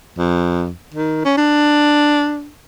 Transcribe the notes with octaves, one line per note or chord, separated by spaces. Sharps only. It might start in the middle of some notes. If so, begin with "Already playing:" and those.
F2
D#3
C#4
D4